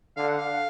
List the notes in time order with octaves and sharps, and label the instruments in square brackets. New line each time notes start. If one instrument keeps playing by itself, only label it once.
[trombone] D3 [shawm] F5
[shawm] F#5
F5